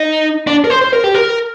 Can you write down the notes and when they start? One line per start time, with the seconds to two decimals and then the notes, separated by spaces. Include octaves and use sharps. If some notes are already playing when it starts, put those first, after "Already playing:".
Already playing: D#4
0.47 D4
0.64 A#4
0.70 C5
0.81 C5
0.93 A#4
1.04 G4
1.14 A#4